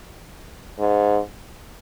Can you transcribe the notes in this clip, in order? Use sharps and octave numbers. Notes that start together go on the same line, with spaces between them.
G#2